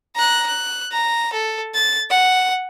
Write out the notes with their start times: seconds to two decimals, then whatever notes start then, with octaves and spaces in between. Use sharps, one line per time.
0.15 A#5 F#6
0.46 F#6
0.92 A#5
1.33 A4
1.74 A6
2.10 F#5